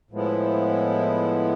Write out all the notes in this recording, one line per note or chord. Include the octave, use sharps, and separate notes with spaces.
A2 F3 G#3 B3 E4